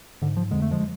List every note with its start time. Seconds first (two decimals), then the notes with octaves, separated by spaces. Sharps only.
0.22 G#2 D3
0.37 F3
0.51 F2 D3 G#3
0.62 A3
0.71 F3 G#3